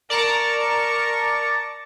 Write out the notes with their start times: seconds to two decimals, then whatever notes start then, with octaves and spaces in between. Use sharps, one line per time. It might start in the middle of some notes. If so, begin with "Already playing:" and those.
0.10 A#4 D5 A5 A#5 C#6